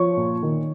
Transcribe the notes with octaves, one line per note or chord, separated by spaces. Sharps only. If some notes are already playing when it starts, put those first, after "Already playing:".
Already playing: F3 C#5 C#6
A#2
D#3